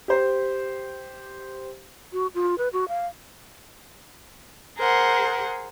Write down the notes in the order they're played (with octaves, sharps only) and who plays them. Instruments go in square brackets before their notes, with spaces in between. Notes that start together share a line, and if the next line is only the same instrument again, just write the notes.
[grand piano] G4 C5
[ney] F#4
F4
B4
F#4
F5
[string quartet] G#4 A#4 C5 F#5